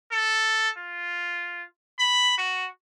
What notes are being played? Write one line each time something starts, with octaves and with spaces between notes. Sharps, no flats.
A4
F4
B5
F#4